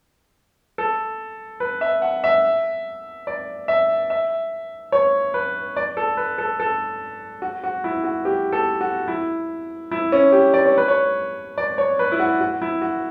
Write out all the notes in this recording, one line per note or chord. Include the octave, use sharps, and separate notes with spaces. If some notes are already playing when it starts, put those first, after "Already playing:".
A4
B4
E5
F#5
E5
D5
E5
E5
C#5
B4
D5
A4
B4
A4
A4
F#4
F#4
E4
F#4
G4
A4
F#4
E4
E4
C#4
G4
D5
C#5
B4
C#5
D5
C#5
B4
E4
F#4
F#4
E4
F#4